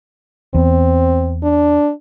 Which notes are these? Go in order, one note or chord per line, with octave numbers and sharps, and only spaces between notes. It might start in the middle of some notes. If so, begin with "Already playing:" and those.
E2 C4
D4